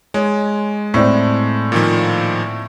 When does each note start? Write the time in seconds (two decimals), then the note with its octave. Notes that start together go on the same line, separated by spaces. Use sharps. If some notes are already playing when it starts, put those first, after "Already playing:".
0.14 G#3 C#5
0.94 A2 A3 C4 D5
1.72 A#2 D#3 F3